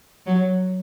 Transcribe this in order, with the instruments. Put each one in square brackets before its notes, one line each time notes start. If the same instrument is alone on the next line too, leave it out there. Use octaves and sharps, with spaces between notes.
[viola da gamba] F#3